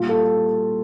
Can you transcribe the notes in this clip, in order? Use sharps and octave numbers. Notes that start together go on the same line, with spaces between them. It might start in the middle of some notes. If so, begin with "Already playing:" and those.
Already playing: A#2 G3 F4
A4